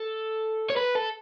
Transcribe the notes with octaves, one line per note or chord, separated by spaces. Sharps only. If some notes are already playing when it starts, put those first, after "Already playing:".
Already playing: A4
C#5
B4
A4